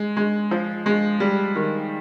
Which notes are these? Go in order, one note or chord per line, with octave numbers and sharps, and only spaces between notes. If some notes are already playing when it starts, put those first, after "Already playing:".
Already playing: G#3
G#3
F3
G#3
G3
D#3